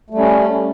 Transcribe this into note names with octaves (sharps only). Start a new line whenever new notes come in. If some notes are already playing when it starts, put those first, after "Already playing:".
G3 A3 C#4